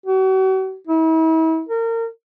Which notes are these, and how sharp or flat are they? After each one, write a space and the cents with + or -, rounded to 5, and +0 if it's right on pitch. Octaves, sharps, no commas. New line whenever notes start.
F#4 +40
E4 -40
A#4 -30